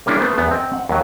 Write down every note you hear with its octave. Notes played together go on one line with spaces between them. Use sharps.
G3 A#3 C#4 D4 E4 G#4
A3 B3 C5
E2 B3
C4 D#5 G5
F#5
D#2 F#3